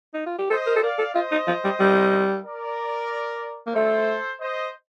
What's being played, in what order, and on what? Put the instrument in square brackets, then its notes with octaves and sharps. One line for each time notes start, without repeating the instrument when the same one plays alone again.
[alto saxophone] D#4
F4
G4
[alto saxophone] A4 [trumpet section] C5 D#5
[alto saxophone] A#4
A4
[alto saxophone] A#4 [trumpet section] D5 F5
[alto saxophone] A4
[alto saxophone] F4 [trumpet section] C5 D#5
[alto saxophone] D#4
F3
G3
G3
[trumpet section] A#4 D5
[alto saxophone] A#3
[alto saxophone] A3 [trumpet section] A4 C5
[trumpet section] C5 D#5